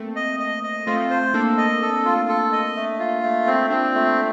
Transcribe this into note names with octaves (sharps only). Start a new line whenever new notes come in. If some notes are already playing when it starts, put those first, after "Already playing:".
Already playing: A3 A#3 C4
D#5
D#5
D#5
A3 C4 F4
C5
A#3 D4 A4
D#5
A4
F4
A4
D#5
A3
F4
A3
C4
C4 D4 F4
A3